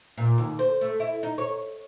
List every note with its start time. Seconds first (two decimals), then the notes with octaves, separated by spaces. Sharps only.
0.17 A#2
0.38 D#2
0.59 C5
0.81 A3
1.00 E4
1.23 D#4
1.38 C#5